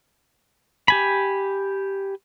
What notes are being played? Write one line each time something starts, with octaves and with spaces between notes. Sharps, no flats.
G4 G#5 B5